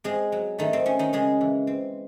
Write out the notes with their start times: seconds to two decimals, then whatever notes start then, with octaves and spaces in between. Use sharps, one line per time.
0.04 G#3 C4 G#4
0.32 F#3
0.58 D#3 A3 D#4
0.73 C4
0.86 D#3 C#4
0.99 D#3 D#4
1.13 C#3 G#3 G#4
1.41 E3
1.67 C4